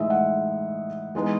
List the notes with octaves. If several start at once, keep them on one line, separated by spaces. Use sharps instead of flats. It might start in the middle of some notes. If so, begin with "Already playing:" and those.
Already playing: A2 E3 G#3 D#4 D#5 E5
F#5
E3 G#3 B3 D#4